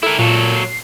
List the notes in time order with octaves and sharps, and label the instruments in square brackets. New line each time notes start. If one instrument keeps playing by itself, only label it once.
[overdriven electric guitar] E4 A#4 [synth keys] A4
[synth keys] A#2 [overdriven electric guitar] F#3 A4
[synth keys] C7